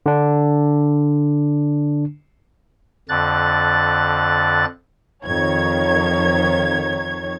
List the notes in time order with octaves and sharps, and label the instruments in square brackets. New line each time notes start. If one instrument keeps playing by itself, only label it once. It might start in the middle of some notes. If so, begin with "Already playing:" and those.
[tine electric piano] D3 D4
[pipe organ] F2 D3 F#6 A6
[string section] F2 D#3 C#5 G#6